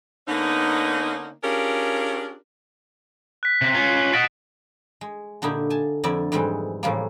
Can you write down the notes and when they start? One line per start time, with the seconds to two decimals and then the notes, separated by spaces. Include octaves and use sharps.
0.28 D3 A#3 B3 C#4 D#4
1.43 C#4 D4 F4 G4 G#4 A#4
3.43 F#6 B6
3.62 C3
3.75 C#4 F4
4.13 F#4 D#5 A6 B6 D7
5.01 G#3
5.42 A#2 D3 D#4 E4 G4
5.70 G#5 A5
6.04 F2 D3 E4 D5
6.32 F2 G#2 E3 G3 G#3 C4
6.83 A2 C#3 E3 F3 G3 A#3